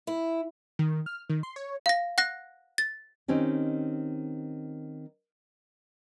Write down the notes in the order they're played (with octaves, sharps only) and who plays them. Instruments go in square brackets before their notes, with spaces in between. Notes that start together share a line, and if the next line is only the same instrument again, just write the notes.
[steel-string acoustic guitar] E4
[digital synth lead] D#3
F6
D#3
C6
C#5
[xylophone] F5 A#6
F#5 F#6 A#6
A6
[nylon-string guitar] D#3 C4 C#4 D#4 G4